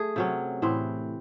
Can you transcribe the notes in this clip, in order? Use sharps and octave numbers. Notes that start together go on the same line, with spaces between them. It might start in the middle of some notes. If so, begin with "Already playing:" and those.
Already playing: A3 G#4
C3 F#3 C#4
A2 E3 C4